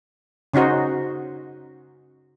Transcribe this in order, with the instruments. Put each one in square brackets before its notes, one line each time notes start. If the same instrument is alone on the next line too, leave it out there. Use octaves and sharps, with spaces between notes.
[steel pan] C#3 C#4 D#4 F#4 C5